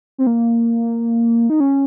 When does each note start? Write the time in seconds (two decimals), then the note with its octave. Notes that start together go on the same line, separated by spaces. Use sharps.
0.18 C4
0.27 A#3
1.50 D#4
1.60 C#4